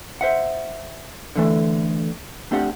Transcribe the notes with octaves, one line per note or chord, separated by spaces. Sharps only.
C5 E5 F#5
D3 E3 A3
A3 C4 D4 G4 F#5